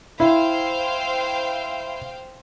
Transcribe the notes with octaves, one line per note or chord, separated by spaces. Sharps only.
E4 C5 F5 G5